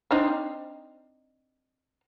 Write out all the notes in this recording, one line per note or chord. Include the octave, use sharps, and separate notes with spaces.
C4 D4 D#4